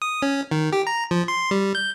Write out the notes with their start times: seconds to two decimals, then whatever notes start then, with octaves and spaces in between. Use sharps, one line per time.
0.02 D#6
0.22 C#4
0.51 D#3
0.73 G4
0.87 A#5
1.11 F3
1.28 C6
1.51 G3
1.75 G6